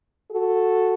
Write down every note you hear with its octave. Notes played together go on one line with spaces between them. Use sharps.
F#4 A4